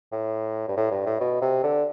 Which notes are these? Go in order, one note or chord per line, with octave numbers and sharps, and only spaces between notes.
A2
G2
A2
G2
A2
B2
C3
D3